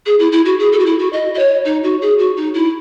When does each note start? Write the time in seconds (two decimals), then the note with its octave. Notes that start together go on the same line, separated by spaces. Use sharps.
0.06 G#4
0.19 E4
0.32 E4
0.45 F#4
0.59 G#4
0.72 A4
0.79 F#4
0.86 E4
0.99 F#4
1.13 D#5
1.34 D#5
1.39 C#5
1.65 D#4
1.83 F#4
2.01 G#4
2.19 F#4
2.37 D#4
2.54 E4